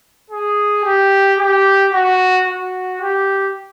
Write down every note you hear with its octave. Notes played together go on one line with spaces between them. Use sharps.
G#4
G4
G4
F#4
F#4
G4